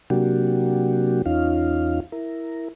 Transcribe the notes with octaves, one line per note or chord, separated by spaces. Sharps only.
C3 F#3 A#3 D4 F#4 G4
E2 C#4 D#4 F4 F5
E4 A#4